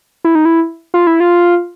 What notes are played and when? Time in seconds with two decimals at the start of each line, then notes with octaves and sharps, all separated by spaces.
0.25 E4
0.35 D#4
0.45 E4
0.94 F4
1.07 E4
1.20 F4